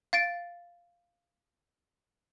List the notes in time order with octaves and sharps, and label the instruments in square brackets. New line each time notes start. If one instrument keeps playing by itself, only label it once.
[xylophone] F5 A6 D7